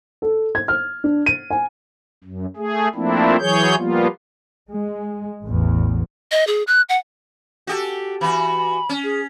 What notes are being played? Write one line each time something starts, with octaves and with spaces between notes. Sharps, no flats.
A4
G#6
F6
D4
D#7
G#5
F#2
A3 G#4
F3 A3 A#3 C4 D4 E4
E3 F#3 G#4 C#5 G6
F3 G3 A#3 B3 F4
G#3
A1 E2
D#5
G#4
F#6
F#5
F#4 G4 A4
E3 F#4 B5
C#4
G#4